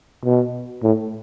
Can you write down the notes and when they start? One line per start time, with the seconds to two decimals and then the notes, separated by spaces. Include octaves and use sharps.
0.25 B2
0.83 A2